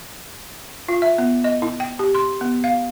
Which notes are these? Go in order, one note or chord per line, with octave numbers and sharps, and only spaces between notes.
F4
E5
B3
D#5
E4
G5
G4
C6
B3
F5